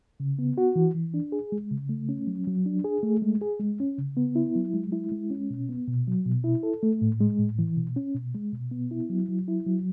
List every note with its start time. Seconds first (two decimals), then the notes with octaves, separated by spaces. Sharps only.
0.20 C#3
0.39 B3
0.58 F#4
0.76 E3
0.94 E3
1.14 D4
1.32 G#4
1.52 G#3
1.71 C#3
1.89 A3
2.09 C#4
2.27 F#3
2.47 F#3
2.66 D4
2.84 G#4
3.03 A3
3.22 G#3
3.41 G#4
3.60 G#3
3.80 C#4
3.98 C#3
4.17 B3
4.36 E4
4.56 F#3
4.74 G#3
4.92 E4
5.12 G#3
5.30 C#4
5.50 B2
5.69 B3
5.88 B2
6.07 F#3
6.26 B2
6.44 E4
6.63 A4
6.83 A3
7.02 A2
7.21 G#3
7.39 A2
7.59 E3
7.77 B2
7.96 C#4
8.15 B2
8.35 G#3
8.53 B2
8.71 B3
8.91 E4
9.10 F#3
9.29 F#3
9.48 E4
9.67 F#3